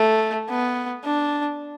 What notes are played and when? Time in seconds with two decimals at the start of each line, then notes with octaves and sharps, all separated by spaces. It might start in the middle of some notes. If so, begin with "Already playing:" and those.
Already playing: A3
0.50 B3
1.05 D4